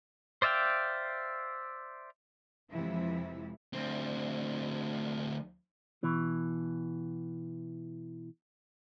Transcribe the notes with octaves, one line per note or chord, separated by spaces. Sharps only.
C5 D5 E5 F5 G5
F2 C3 E3 F3 G#3 E4
D2 C4
B2 E3